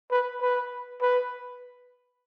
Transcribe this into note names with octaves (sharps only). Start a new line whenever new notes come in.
B4
B4
B4